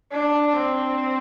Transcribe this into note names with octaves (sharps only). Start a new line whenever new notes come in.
D4
C4